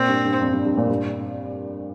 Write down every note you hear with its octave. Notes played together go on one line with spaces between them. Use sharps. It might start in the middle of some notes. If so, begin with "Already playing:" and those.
Already playing: A#2 C4
G2
G2
F2
G2
G2
A#2
G2